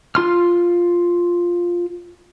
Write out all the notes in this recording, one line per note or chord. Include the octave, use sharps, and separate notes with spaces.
F4 C6 F6